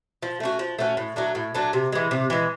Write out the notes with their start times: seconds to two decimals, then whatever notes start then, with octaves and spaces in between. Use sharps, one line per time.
0.22 F3
0.40 A3 C#4 F#4
0.59 F3
0.78 A3 C#4 F#4
0.97 A2
1.16 F#3 A3 D4
1.35 A2
1.55 F#3 A3 D4
1.73 C3
1.92 E3 G#3
2.11 C3
2.30 E3 G#3